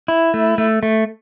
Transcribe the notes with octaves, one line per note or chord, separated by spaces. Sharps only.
E4
A3
A3
A3